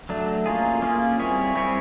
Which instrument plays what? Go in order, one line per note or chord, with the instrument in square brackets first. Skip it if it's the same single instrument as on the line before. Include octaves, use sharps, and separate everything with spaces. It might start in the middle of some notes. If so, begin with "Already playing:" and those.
[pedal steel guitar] F#3 A3 D4
A#3 C#4 F4 G#4
A#3 C#4 F4 G#4
G3 C4 E4 G#4 C#5
G3 C4 E4 G#4 C#5